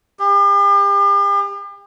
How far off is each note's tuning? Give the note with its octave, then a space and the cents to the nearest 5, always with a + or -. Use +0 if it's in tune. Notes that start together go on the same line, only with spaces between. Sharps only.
G4 +40